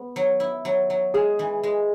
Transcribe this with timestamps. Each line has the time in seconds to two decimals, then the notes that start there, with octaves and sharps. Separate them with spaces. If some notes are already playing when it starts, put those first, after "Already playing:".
Already playing: B3
0.16 F#3
0.40 E4
0.65 F#3
0.90 F#3
1.14 G#3 G#4
1.39 E3
1.63 G#3